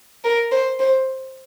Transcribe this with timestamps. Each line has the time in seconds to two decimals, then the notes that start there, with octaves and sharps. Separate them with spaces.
0.24 A#4
0.51 C5
0.80 C5